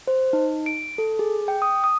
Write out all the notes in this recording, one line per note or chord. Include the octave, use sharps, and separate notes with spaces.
C5
D#4
D7
A4
G#4
G5
D#6
D#6